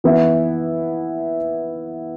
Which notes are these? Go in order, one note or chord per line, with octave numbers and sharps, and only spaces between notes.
E3 B3 E4